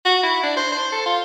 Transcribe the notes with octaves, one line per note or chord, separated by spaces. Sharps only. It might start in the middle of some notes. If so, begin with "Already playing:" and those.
F#4
E4
D4
C5
C5
A4
F4